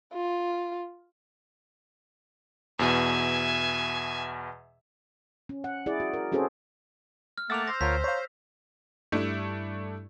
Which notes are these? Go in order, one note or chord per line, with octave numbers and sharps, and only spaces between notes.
F4
E2 B2 E5 G#5
C#4
F#5
E4 G#4 D5
F#4
A#4
C4 C#4 F#4 G#4 A4 C5
F6
A3 A#3 E5 F#5 D6 E6 A6 F7
C5 A#6
D2 F4 A#4 C#5 B6
C#5 F5 A#5
G2 G3 A3 D4 E4